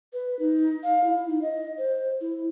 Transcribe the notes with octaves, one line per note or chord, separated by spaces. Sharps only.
B4
D#4
F5
E4
D#4
D#5
C5
E4